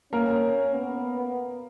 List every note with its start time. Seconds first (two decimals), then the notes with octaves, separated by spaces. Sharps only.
0.12 A#3 C#4 A#4
0.73 B3